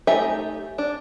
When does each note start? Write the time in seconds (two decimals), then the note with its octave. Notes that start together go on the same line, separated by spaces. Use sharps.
0.07 A3 D#4 G4 E5 G#5
0.78 D4